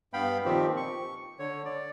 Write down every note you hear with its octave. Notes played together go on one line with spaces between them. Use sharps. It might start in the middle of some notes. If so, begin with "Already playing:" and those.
G2 B3 F5 G5 B5
A#2 D#3 F3 C4 G4
C#6
D3 C#5
D5